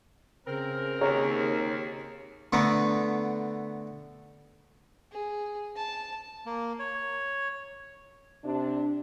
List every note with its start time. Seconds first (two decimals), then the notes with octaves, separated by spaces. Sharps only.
0.47 C#3 C4 A#4
1.01 D#2 G#4 C#5 A#5
2.52 D3 A3 B3 A#4
5.12 G#4
5.76 A5
6.45 A#3
6.79 C#5
8.44 C3 D4